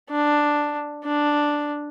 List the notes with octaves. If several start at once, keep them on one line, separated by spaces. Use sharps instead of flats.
D4
D4